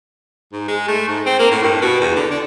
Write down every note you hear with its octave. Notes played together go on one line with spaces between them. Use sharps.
G#2
G#3
A3
G#2
C4
A#3
A2
G2
B2
E2
D3
D4